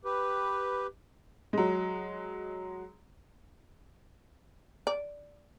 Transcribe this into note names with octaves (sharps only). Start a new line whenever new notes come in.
G4 B4
F#3 G#3
D5